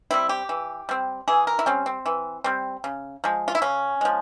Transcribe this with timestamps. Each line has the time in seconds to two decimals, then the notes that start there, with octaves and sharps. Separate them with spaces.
0.11 G3 C4 E4
0.29 G4
0.49 E3
0.89 G3 C4
1.28 E3 G#4
1.47 A#4
1.59 E4
1.66 G3 C4 C#4
1.86 C4
2.06 E3
2.44 G3 C4
2.84 C#3
3.24 F3 G#3
3.48 F4
3.55 E4
3.62 C#3 C#4
4.01 F3 G#3